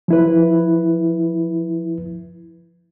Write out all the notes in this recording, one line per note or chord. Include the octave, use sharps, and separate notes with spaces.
F3 E4 B4